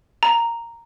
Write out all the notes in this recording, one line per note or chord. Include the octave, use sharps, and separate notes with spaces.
A#5